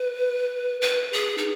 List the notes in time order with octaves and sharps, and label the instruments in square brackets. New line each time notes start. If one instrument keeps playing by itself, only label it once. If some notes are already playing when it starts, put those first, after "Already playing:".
Already playing: [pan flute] B4
B4
G#4
D#4